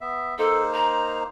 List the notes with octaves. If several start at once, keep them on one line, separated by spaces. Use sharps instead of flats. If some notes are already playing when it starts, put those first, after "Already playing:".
B3 E5
A#3 D#4 A4 C5
A#5